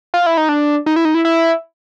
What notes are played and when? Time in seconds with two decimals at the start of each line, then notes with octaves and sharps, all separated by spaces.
0.14 F4
0.26 E4
0.37 D#4
0.49 D4
0.86 D#4
0.96 E4
1.05 D#4
1.15 E4
1.25 E4